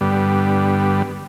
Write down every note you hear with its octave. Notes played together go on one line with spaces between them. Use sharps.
G2 D3 G3 B3